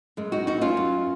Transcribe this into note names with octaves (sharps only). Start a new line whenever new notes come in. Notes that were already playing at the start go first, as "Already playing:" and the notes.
F#2 G#3
D#4 F#4
F#2 D#4 F#4
C#4 F4
F#2